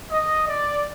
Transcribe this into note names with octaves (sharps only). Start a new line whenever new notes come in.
D#5
D5